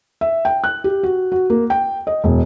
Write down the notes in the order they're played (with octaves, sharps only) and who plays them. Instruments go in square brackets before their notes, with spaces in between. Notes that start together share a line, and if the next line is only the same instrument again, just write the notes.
[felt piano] E5
G5
F#6
G4
F#4
F#4
A#3
G5
D#5
E1